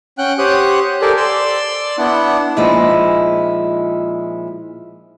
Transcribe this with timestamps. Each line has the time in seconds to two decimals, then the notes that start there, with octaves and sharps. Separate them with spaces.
0.18 C#4 F#5 G5 F#6
0.38 G4 C5 C#5 F#5 D#6 F#6
1.02 G4 A4 A#4 C5 D5 G#5
1.17 D5 C6 E6
1.98 B3 D4 E4 F#5
2.57 A#2 F3 G#3 D#4 E4